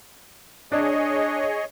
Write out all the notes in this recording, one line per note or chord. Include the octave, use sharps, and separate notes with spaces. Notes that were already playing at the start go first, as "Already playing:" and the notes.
D4 G#4 C#5 D#5